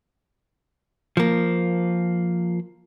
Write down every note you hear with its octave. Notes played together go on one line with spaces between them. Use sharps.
F3 A#3